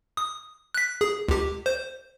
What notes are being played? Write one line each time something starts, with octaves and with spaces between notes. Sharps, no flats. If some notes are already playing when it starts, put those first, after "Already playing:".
D#6
F#6 B6
G#4
C#2 G4
C5